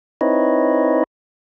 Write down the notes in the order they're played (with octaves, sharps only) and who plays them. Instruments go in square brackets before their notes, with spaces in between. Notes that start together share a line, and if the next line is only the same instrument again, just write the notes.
[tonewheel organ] C4 D#4 E4 B4 C#5 D#5